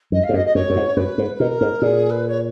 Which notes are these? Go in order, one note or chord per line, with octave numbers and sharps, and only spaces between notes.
F#2 D#5
F5
G#2
F#2 D#5
D#5
F#2 C#5
F#2
G#2
F#2 B4
G#2
B4
B2 A#4
G#2
A#2 G#4
B4
C#5